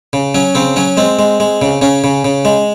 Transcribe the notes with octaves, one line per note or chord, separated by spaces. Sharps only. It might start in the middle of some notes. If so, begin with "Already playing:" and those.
C#3
F#3 C#4
C#3 C4
F#3 C#4
G#3 C4
G#3
G#3
C#3
C#3 C#4
C#3
C#3
G#3